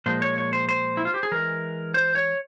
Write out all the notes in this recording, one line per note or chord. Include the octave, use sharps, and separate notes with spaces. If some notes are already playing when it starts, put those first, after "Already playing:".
A#2 F3 G#3 C5
C#5
C#5
C5
C5
E4
F4
G4
G#4
E3 G#3 A#4
C5
C#5